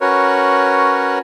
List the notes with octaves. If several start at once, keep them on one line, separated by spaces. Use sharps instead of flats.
C#4 F#4 A#4 B4 C#5